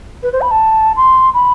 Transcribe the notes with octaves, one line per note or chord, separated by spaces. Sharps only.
B4
C5
B5
A5
C6
B5